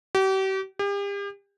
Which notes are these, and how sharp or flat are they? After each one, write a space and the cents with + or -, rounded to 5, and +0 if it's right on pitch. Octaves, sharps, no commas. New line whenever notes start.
G4 -40
G4 +40